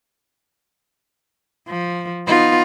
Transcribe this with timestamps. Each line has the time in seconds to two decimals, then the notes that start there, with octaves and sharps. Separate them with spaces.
1.68 F3
2.27 B3 D#4 F4